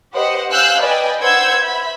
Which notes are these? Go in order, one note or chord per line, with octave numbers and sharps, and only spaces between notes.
G4 B4 C5 D#5 F#5
F5 G#5 E6 F#6 G6
B4 D5 D#5 G5 G#5
B4 C5 F#5 E6 G6 G#6
E5 B5